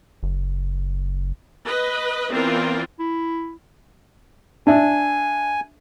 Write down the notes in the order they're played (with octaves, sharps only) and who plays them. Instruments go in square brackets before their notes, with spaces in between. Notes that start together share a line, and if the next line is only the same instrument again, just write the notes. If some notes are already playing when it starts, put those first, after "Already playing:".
[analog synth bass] F#1
[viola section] B4 D#5
E3 B3 C4 F4 A#4 D5
[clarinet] E4
[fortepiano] D4 E5 [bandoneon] G#5